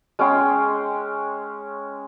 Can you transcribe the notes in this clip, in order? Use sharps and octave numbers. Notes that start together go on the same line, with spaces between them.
G#3 C#4 G5 C6